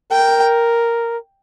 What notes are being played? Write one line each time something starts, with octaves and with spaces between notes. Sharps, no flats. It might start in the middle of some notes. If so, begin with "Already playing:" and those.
A#4 G5